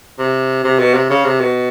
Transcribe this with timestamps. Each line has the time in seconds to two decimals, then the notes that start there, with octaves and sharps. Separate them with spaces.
0.19 C3
0.64 C3
0.79 B2
0.95 C3
1.10 C#3
1.25 C3
1.40 B2